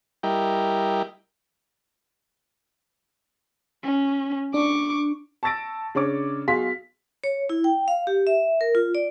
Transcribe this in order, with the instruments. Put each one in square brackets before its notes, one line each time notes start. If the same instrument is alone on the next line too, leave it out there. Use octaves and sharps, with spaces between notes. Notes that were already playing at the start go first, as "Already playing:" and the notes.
[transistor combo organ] G3 E4 G4 A#4 D#5 G5
[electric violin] C#4
[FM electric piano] D4 [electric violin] C#6 D6
[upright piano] A5 C#6 E6 A6 A#6 D7
C#3 D4 C#5 D6
B1 F#4 G#4 F5 C6 B6
[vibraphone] C#5
E4
G5
F5
G4
E5
A#4
F4
D5